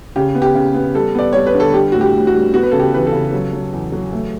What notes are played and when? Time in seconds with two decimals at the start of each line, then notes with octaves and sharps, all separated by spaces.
0.16 C#3 G4
0.35 B3
0.42 G4
0.55 C#3
0.75 B3
0.95 G3 A4
1.15 B3 D5
1.33 G3 C#5
1.47 B4
1.55 D3
1.60 A4
1.74 G3 G4
1.92 A2 F#4
2.01 G4
2.14 A2
2.27 F#4
2.34 G3
2.54 B3 F#4
2.63 B4
2.72 C#3 A4
2.80 G4
2.93 E3 B4
3.07 A4
3.13 C#3
3.33 F#3
3.53 F#3
3.73 E2
3.92 F#3
4.13 A3